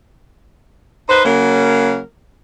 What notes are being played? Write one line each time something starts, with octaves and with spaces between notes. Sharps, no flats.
D#4 B4 C5
C#3 F#3 A#3 A#4